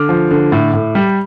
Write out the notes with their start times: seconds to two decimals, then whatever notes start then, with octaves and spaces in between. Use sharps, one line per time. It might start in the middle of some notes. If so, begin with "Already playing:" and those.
Already playing: D3 D6 F6
0.09 F3
0.31 D3
0.52 A2
0.73 A2
0.95 G3